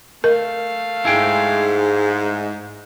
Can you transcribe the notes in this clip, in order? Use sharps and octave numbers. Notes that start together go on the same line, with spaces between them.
A3 A#4 F5
G#2 E4 G#4 G5